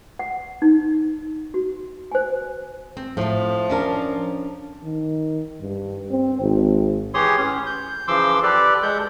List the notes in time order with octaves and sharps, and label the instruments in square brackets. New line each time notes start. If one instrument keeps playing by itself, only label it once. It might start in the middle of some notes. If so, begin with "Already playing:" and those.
[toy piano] F#5
D#4
F#4
C5 G#5
[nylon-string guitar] C4
[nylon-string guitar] A2 A3 [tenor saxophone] F3
[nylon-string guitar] C#4 D4 A#4
[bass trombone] D#3
G2
C4
G#1
[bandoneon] E3 G4 G#4 C#5 C6 D#6
A2 C#4
G6
C#3 E3 F3 C6 D6 E6
G4 A4 B4 D5
G#3 A4 G6